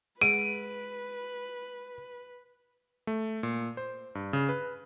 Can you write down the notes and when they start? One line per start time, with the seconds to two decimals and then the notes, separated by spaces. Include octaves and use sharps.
0.21 G#3 G#4 B4 F#5 D7 D#7
3.07 A3
3.43 A#2
3.77 C5
4.15 G2
4.33 C#3
4.49 B4